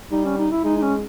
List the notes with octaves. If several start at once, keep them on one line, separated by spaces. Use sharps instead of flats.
G3 D#4
C#4
D#4
E4
G#3 D#4
D#4
C#4